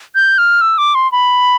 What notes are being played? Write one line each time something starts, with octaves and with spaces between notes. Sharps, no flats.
G6
F6
E6
D6
C6
B5